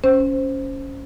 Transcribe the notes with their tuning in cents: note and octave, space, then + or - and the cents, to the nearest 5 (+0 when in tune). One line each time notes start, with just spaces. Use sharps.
C#4 +0 C5 +0